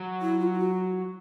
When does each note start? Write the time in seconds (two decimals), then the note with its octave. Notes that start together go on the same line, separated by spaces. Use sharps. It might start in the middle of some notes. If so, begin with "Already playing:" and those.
Already playing: F#3
0.22 E4
0.40 F4
0.54 F4
0.58 F#4